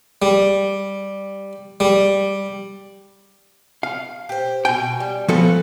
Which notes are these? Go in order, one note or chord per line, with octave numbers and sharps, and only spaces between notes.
G3
G3
F5
G4 C5
B2 G5 G#5
G3
F3 B3 F#4 G#4 A4